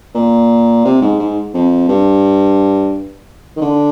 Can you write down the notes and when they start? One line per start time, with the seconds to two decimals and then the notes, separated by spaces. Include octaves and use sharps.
0.15 A#2
0.85 C3
1.01 G#2
1.19 G#2
1.54 F2
1.88 G2
3.56 D#3
3.61 D3